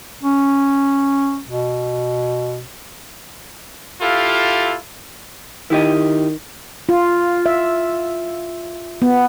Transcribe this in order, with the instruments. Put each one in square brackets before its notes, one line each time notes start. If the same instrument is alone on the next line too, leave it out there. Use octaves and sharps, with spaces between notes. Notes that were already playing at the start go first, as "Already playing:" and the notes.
[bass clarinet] C#4
B2
[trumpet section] E4 F4 G4 A4 F5
[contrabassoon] D#3 [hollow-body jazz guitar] E4 G4 D#5
[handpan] F4
E5
B3